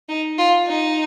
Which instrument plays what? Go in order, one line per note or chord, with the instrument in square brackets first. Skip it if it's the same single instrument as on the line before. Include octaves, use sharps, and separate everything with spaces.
[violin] D#4
F4
D#4